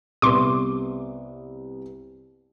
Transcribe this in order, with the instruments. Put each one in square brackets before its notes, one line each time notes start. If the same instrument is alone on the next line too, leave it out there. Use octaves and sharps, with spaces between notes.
[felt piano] C2 B3 [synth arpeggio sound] C6 D6